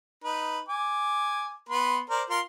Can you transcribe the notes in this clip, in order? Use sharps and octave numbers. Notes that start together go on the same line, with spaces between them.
D#4 B4
G#5 D6
B3 B4 C6
A#4 C5 D5
F4 A#4 C6